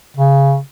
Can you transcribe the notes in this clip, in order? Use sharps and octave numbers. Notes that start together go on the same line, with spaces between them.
C#3